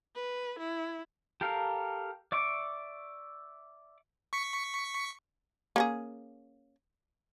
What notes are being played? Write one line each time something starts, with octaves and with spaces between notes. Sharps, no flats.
B4
E4
G4 A4 A#4 F5
D5 E5 C#6 D6
C#6 B6 C#7
A#3 C#4 G#4